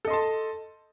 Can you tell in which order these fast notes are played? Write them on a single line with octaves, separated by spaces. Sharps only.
A4 D#5 C6 A5